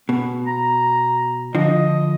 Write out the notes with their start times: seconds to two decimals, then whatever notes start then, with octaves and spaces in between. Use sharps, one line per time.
0.09 B2 B3
0.47 A#5
1.55 D3 F3 D#5